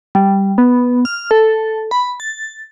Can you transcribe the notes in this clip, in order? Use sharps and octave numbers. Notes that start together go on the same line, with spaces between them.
G3
B3
F6
A4
B5
A6